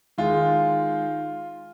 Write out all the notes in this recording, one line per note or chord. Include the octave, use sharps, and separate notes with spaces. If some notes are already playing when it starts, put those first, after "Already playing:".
D#3 G#3 F4